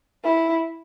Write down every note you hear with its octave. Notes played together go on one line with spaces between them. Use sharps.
E4